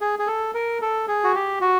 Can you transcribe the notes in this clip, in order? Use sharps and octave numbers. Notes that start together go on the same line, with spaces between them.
G#4
G#4
A4
A#4
A4
G#4
F#4
G4
F#4